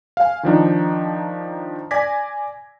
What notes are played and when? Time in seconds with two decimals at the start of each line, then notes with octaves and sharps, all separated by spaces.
0.17 F5 G#5
0.43 D#3 F3 D4 D#4
1.91 D5 G#5 D6 G#6 A#6 B6